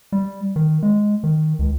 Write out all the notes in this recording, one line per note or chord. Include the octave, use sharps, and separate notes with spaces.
G3
D#3
G#3
D#3
C#2